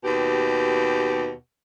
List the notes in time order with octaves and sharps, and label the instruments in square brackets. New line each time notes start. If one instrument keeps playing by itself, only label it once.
[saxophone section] D#2 B2 G4